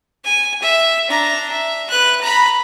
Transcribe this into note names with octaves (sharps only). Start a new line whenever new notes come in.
G#5
E5
D4 A#5
E5
B4 F#6
A#5 B5